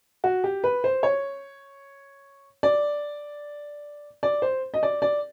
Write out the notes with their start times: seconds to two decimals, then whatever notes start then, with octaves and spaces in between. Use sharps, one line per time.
0.24 F#4
0.44 G4
0.64 B4
0.84 C5
1.03 C#5
2.63 D5
4.23 D5
4.42 C5
4.74 D#5
4.83 D5
5.02 D5